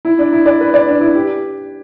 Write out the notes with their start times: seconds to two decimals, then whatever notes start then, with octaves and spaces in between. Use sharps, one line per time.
0.05 E4
0.19 D4
0.32 E4
0.46 D5
0.61 B4
0.74 D5
0.88 D4
1.01 E4
1.15 G4